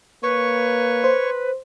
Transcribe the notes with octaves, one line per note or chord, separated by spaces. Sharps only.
A#3 B4 C#5 C#6
C5